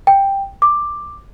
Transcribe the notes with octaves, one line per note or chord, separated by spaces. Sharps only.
G5
D6